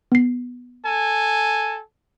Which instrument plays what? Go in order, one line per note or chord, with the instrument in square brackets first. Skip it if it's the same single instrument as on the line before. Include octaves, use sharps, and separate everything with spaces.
[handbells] B3 C7
[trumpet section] A4 G#5